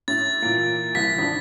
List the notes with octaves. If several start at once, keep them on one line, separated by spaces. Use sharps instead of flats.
A2 A6
A#2 E3 A#3
C2 E3 B6
G#1 D4